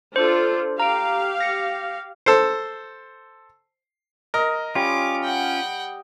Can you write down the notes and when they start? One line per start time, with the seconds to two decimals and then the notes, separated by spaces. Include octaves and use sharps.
0.16 D4 F4 A4 C5
0.80 G4 F5 A#5 D7
1.41 A#6 C#7
2.26 A4 C5
4.34 A#4 D#5
4.75 G3 C#4 F4 D6
5.23 F#5 G5